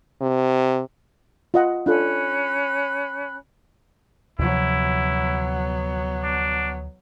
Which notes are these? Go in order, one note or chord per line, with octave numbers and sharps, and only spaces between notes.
C3
F4 D#5 F#5
C#4 D4 F4 A4 B5 F#6
D2 C3 F3 F#3 B3 E4
D4